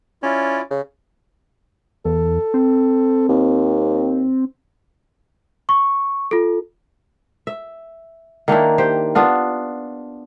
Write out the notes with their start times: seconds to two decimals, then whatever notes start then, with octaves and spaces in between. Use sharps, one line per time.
0.23 C#4 E4 F4 D5
0.70 C#3
2.05 E2 A4
2.54 C4
3.29 D#2
5.69 C#6
6.31 F4 A4
7.47 E5
8.48 D#3 A#3 D4 E4
8.78 G4 C5
9.15 B3 D4 F4